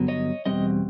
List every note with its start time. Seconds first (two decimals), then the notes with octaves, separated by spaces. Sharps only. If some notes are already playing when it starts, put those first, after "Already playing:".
Already playing: G2 D3 F#3 B3
0.08 C#5 D#5
0.46 E2 B2 G3 C4 D#5